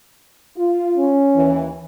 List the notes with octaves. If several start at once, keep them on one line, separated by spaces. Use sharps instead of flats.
F4
C#4
D#2 E3